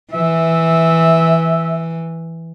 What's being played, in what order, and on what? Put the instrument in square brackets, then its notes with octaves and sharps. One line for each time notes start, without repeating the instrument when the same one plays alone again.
[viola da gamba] E3 [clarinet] E5